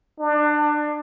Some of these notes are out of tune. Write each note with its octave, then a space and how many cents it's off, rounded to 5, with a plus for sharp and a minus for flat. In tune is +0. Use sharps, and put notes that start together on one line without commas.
D4 +25